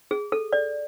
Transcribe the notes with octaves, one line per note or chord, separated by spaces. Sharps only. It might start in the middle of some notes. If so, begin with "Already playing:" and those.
G#4
A4
D5